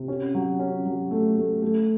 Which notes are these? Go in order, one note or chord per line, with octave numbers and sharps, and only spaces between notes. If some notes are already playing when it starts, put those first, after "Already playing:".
Already playing: C3
C#4
F#3
C#4
F#3
A3
A3
A3